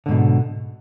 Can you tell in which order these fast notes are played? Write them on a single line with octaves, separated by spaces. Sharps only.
D3 G#2 B2